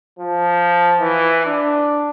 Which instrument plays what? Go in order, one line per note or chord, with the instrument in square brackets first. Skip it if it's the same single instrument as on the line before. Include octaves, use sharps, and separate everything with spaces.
[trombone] F3
E3
D4